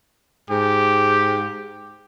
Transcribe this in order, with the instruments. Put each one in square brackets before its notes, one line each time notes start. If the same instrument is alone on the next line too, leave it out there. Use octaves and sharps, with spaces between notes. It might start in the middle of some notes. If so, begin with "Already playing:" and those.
[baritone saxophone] G#2 [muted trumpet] G4